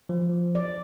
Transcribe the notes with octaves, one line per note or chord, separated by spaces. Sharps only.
F3
D5